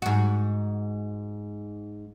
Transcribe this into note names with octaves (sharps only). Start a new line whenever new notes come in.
G#2 F#4